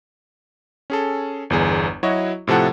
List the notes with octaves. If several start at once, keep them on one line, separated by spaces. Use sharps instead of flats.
C#4 G#4 A4
G1 E2 G#4
F#3 E4 F#4 C#5 D#5
A2 C3 F3 A4 F#5